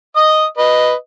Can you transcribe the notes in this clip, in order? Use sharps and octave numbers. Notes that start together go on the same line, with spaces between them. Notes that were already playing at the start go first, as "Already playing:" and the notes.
D#5 D#6
B4 D#5